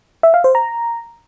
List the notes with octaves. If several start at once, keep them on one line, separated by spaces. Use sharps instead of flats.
E5
F5
C5
A#5